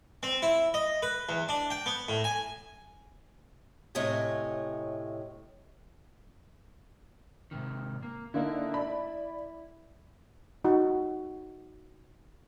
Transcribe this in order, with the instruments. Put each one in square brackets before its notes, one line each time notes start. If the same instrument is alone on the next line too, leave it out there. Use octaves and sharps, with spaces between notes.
[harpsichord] C4
E4
D#5
B4
E2
D4
G5
B3
A2
G#5
[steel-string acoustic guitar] A2 C3 C#5 D#5 G#5
[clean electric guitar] G#2 C3 D#3
A#3
[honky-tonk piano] D3 A#3 D#4 [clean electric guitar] E4 E5
[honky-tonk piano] D5 B5
[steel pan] D#4 F#4